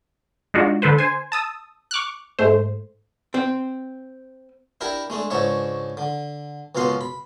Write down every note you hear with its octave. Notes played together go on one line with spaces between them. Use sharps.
G#3 D4 D#4 F4 F#4
D3 A4 B4 C5
C5 G#5
A5 D#6 E6
C#6 D6 F6 F#6
G#2 A3 C5
C4
D4 E4 G4 A#4
G#3 A3 D4
C#2 G#2 D4 C#5 E5
D3
C#2 F#2 B2 F5 C6
B5